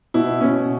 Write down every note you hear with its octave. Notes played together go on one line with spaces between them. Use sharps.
B2 E4
B2 C#4